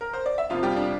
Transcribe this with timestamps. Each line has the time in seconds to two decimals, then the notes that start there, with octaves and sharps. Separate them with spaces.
0.01 A#4
0.13 C5
0.26 D5
0.38 E5
0.50 F2 C3 F3 A#3 F4 F5
0.63 G3 G4
0.77 D4